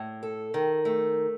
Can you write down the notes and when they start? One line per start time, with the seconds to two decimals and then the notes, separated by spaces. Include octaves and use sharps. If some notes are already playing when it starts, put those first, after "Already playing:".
Already playing: A2
0.23 A4
0.54 D#3
0.85 A3